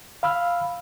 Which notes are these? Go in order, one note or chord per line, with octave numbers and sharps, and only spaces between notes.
F5 B5 E6 F6